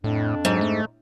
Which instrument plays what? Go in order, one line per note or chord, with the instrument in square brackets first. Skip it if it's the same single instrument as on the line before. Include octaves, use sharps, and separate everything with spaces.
[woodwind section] F2 D4 [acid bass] A2
[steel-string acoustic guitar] G#2 [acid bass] F#3
[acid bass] A3